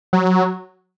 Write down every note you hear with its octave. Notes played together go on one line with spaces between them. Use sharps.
F#3